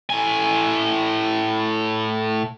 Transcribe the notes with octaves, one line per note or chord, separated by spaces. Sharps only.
A2 G#5